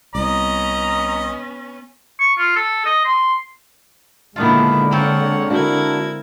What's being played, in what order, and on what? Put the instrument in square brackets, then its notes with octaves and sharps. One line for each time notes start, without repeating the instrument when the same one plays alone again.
[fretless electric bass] C2 [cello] B3 C#4 [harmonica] D#5 [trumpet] A#5
[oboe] C#6
F4
A4
D#5
C6
[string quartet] A#2 D#3 E4 [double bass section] D3 G#3 [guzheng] B3 D4 F4
[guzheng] A#3 C4 F4 [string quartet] C#5 F#5
[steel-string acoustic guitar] D4 F#4 [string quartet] E4 A#4 G#6